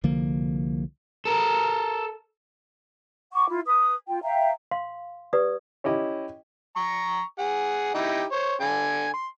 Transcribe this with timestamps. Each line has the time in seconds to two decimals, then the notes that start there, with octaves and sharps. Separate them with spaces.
0.04 C2 D3 F3 A#3
1.25 A4 A#4
3.33 F#5 C#6 D6
3.48 E4 F4
3.66 B4 D#6
4.08 F4 G5
4.23 E5 F5 G5 A#5
4.71 F5 C6
5.33 G4 B4 D5 D#6
5.84 C#4 E4 G4 D#5 G5
6.76 A#5 C#6
7.39 G#4 F#5
7.94 D#4 E4 G4
8.32 C5 C#5
8.61 D3 G#5
9.14 C6